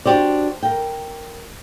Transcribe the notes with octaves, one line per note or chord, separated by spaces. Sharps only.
D4 F#4 G4 C5 D5
A#4 G5